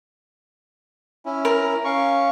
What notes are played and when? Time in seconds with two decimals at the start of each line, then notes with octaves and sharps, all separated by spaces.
1.26 C#4 E4
1.45 A#4
1.85 C#4 F5 C#6